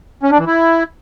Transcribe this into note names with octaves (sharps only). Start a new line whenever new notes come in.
C#4
D4
E3
E4